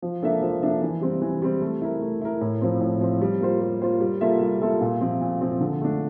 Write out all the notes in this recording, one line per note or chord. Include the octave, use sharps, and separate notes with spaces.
F3
A#3 D4 A4 E5
F3
A#3 D4 A4 E5
E3
G3 C4
E3
G3 C4
A3
E4 A#4
A3
E4 A#4
A2
F3 C4
A2
F3 C4
G3
A#3 F4 C5
G3
A#3 F4 C5
G3
A#3 F4 A4 E5
G3
A#3 F4 A4 E5
A#2
F3 C4
A#2
F3 C4
D3
A3 D4